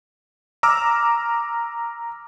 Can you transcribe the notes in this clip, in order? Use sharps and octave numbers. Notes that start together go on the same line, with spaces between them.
A#5 D6 E6 F6